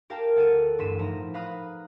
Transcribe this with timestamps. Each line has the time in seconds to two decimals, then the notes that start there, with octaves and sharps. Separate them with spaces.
0.10 G4 A#4 F5 G5 A5
0.36 D2 A4 F#5 A6 C#7 D#7
0.78 A1 G2 C6 B6 D#7 E7
0.99 A2 F3 D#4 A#5
1.34 B4 F5 A#5 B5 D#6 F#6